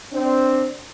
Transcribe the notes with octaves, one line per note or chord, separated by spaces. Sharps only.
C4 D4